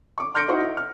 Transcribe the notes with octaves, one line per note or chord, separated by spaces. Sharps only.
C#6 D6
C6 F6 G6 A#6 C#7 D7
D#4 E4 F#4 C5 F#5 C#6
E4
F6